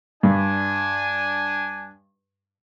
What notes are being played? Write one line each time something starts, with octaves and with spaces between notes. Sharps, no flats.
G2 D4 G#5